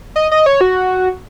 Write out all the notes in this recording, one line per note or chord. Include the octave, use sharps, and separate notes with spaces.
D#5
D#5
C#5
F#4